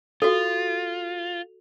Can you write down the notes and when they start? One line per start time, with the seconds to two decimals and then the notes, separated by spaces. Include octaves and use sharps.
0.22 F4 F#4 A4